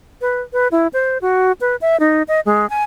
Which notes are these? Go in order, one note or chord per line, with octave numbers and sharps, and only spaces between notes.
B4
B4
E4
C5
F#4
B4
E5
D#4
D#5
G#3
G#5